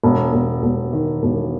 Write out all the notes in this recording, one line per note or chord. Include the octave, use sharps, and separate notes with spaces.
E1
E1
E1
D#3
E1